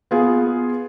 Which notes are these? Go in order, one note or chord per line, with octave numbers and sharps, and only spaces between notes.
B3 F4 G#4